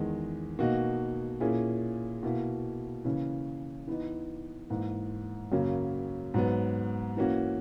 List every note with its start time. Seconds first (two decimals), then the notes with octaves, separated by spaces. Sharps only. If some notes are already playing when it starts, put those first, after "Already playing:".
Already playing: E2 D#3 G#3
0.59 B2 A#3 D#4 F#4
1.40 A#2 A#3 C#4 E4 G#4
2.23 B2 A#3 E4
3.05 C#3 E3 A#3 C#4
3.88 E3 B3 D#4
4.70 G#2 E3 A#3
5.52 F#2 C#3 F#3 A#3
6.34 G#2 F#3 B3
7.17 E3 A#3 C#4 F#4